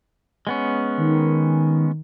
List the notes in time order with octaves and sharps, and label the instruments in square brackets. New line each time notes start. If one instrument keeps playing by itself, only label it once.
[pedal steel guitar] G#3 B3 C#4
[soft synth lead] D#3